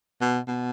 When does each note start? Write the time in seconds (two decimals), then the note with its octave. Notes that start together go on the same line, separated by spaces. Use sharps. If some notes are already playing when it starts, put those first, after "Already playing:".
0.21 B2
0.48 B2